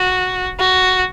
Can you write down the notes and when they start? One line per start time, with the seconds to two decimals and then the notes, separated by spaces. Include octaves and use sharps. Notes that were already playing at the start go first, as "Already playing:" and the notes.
Already playing: F#4
0.60 F#4